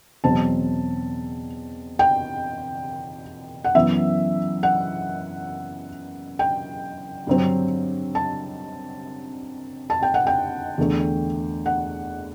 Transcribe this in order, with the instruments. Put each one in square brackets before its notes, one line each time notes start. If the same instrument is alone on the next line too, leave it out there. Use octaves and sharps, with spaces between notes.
[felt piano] E2 B2 F#3 C4 A5
G5
F#5
F#2 E3 B3 E5
F#5
G5
G2 D3 F#3 C4
A5
A5
G5
F#5
G5
E2 D3 A3
F#5